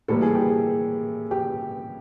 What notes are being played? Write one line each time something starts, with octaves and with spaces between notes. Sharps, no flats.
A2 E3 G3 A#3 A4
G#4
G4
G#4
G4